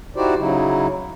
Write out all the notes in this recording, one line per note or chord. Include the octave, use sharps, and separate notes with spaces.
D#4 E4 F#4 G4 C5 D5
C#3 F#3 D#4 E4